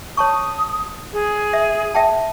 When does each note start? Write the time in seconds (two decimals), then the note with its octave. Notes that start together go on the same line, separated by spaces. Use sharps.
0.17 C#5 A5 C#6 D#6
1.13 G#4
1.53 E5
1.94 E5 G5 A5